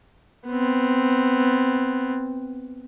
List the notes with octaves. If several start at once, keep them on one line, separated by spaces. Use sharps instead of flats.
B3 C4